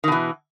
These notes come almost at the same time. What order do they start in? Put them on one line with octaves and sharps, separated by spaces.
D#3 B2 E3